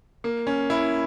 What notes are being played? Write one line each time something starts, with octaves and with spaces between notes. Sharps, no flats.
A#3
C#4
E4